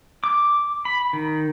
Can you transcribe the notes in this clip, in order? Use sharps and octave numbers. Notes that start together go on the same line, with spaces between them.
D6
B5
D#3